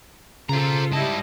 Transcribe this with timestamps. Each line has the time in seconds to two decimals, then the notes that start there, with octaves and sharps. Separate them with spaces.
0.49 C#3 F4 A4 C5 A#5
0.92 G#2 G3 E4 D#5 A5